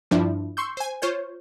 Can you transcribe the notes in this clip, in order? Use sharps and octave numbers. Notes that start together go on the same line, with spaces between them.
G2 F3 D4 E4
C6 C#6 E6 G6
C5 G#5
F4 C5 C#5 G6